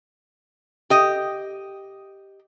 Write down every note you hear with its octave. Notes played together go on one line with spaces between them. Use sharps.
G4 D#5